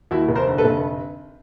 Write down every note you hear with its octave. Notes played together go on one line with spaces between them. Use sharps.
D#2 E4 F#4
F1
A#4 C5
D3
A4 B4
F1